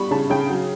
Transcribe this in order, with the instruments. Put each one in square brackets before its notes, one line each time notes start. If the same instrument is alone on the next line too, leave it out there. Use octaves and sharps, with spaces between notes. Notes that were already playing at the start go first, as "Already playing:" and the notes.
Already playing: [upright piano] G3 B3 B5 C#6
C#3 A5
C#3 G5
F#3